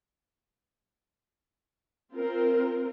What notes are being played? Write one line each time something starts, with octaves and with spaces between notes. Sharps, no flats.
C4 F4 A#4 C5